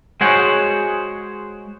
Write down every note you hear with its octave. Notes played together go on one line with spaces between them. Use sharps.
G#3 F#4 G#4 C5 C#5 F#5